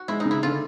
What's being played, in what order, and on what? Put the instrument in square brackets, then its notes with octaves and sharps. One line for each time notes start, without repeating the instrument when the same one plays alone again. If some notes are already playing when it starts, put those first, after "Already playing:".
Already playing: [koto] F#4
[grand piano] G#3 [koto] E4
[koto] D#4
[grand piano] C#3
[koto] E4
[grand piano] D3 [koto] F4